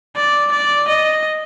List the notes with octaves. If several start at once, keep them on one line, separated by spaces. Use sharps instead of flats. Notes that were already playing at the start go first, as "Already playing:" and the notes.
D5
D5
D#5